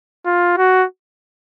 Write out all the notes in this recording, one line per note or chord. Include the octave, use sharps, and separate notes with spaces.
F4
F#4